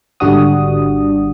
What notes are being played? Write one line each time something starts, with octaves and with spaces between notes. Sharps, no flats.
G#1 D3 G3 D4 F#4 D#6